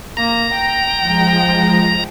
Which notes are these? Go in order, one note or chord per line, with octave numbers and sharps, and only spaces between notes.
A#3 A#5
G5
F3 G#3